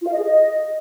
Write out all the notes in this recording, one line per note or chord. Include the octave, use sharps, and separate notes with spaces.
F4
F5
D#5
G#4
D#5